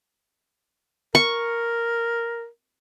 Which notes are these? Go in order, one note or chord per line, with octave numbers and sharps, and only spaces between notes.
A#4 C#6